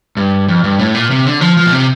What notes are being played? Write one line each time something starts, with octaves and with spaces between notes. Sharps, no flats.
G2
F2
G2
A2
A#2
C3
D3
F3
F3
A#2
C3